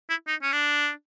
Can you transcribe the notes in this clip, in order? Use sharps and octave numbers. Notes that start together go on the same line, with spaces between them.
E4
D#4
C#4
D4